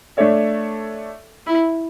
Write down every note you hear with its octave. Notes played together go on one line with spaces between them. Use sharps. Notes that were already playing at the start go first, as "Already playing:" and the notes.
A3 D4 A4 C#5 E5
E4